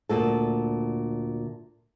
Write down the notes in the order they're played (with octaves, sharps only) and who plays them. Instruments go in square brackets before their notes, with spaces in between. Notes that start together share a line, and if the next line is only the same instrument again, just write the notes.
[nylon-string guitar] D2 A#2 A4